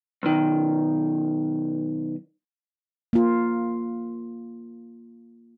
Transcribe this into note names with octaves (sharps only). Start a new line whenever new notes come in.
B1 D#3
A#3 F4